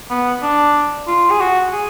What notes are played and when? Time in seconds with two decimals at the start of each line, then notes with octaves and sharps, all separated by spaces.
0.11 B3
0.43 D4
1.08 F4
1.31 G#4
1.40 F#4
1.73 G#4